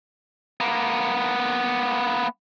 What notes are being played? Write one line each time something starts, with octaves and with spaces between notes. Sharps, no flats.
A#3 B3